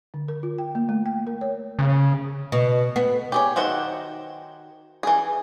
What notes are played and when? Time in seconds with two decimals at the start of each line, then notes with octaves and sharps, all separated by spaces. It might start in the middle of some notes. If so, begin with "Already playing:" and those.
0.14 D3
0.28 A#4
0.43 F4
0.58 G5
0.75 A#3
0.89 A3
1.06 G5
1.27 A#4
1.41 C#5
1.79 C#3
2.52 B2
2.96 B3
3.32 G4 G#4 C#5
3.56 D#3 F#4 C5 E5 F#5
5.03 E3 G#4